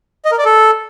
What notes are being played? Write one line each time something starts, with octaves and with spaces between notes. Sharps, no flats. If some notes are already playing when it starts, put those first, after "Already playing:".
D#5
A#4
D5
A4